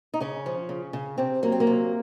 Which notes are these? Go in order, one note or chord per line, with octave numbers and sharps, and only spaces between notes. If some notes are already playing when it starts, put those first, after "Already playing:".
D#4
C#3 C#4
F3
C#3
C#3
C3 C4
F#3 A#3
C4
A#3
C3